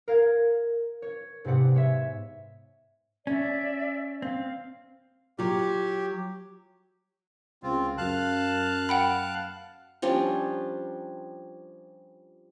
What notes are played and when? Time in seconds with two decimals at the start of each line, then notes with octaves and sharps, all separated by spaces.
0.08 A#4 F5 G#6
1.02 C#5
1.44 G#2 C3 B3 D5 F#5
1.74 G#3 C#5 E5
3.27 C#4 D5 E5
4.22 C4 F5
5.39 F#3 F4 G4
7.63 C#2 C4 F4
7.98 F#2 F5 A5 F#6
8.89 F#5 G5 B5
10.02 F3 G3 C#4 D4